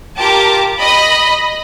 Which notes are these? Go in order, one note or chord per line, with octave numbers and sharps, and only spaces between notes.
F4 G4 A#4 A5 D6
D#5 B5